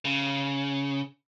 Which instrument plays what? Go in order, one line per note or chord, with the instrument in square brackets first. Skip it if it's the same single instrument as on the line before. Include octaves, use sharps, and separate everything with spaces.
[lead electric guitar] C#3